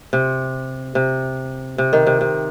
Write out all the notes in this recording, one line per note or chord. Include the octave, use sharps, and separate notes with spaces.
C3
C3
C3
D#3
C3
C3